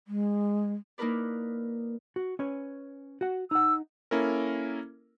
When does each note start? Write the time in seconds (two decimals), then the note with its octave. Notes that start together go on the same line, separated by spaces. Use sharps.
0.08 G#3
0.98 A#3 D#4 E4 A#4 B4 D5
2.16 F#4
2.39 C#4 B4 C#5
3.21 F#4 F#5
3.51 D#4 F#5 E6
4.11 A#3 C#4 E4 A4 A#4